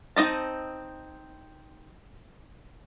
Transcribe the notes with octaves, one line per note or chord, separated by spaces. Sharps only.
C4 D#4 D#5 A5